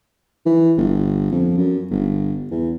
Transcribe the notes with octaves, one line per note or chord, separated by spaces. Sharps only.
E3
G1
F2
F#2
G1
E2